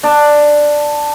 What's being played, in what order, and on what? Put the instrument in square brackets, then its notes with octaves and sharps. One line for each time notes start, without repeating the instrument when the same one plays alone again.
[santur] D4